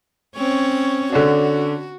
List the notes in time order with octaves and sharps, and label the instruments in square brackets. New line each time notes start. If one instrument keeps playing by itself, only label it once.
[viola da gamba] C4 C#4 C#5
[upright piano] D3 C#4 D4 [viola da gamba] F#4